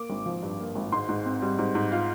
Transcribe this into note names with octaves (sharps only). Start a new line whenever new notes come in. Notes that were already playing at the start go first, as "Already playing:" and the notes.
Already playing: A#3 D6
G#1
F3
G2
A#3
G#1
G#2 C6
G#2
C4
G3
G#2
G#2
F4